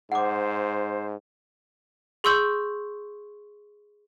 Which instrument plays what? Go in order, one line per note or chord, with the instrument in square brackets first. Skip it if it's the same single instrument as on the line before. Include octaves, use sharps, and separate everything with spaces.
[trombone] G#2 [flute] C5 [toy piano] F#5 D6
[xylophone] G#4 C6 C#6 E6 G6 F#7